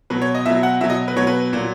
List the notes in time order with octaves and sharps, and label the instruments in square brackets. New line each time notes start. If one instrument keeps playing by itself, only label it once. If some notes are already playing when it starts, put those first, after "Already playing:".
[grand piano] B2 F#3 B4
C#5
D#5
B2 F#3 E5
F#5
B2 F#3 E5
D#5
B4
B2 F#3 C#5
B4
A#2 F#3